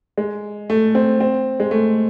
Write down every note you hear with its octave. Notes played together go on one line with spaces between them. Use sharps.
G#3
A3
C4
C4
G#3
A3